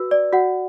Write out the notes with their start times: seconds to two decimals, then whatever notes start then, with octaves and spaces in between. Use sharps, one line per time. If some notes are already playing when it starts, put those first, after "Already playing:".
Already playing: F#4 B4 E6
0.11 D5
0.33 F#4 F#5